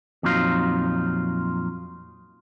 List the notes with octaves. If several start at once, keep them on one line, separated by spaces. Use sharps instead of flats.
F2 A#2 F#3 D#4 F4